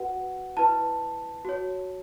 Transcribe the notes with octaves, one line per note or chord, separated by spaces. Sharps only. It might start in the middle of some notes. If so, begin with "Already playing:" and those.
Already playing: F#4 B4 F#5
E4 B4 A5
F#4 C#5